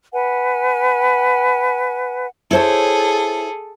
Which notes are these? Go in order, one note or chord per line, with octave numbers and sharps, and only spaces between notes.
B4 F#5 G#5
E4 G#4 A4 C5 C#5